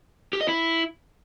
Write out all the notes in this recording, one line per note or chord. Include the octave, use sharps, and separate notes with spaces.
G4
D#5
E4